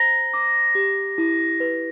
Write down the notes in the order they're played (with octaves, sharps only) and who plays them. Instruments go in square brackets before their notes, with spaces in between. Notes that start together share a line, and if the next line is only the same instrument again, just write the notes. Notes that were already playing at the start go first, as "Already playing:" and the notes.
Already playing: [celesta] C5 A#5 [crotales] A#6
[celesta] D6
G4
E4
B4